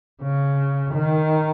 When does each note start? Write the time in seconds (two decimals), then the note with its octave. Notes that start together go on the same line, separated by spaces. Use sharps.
0.23 C#3
0.94 D#3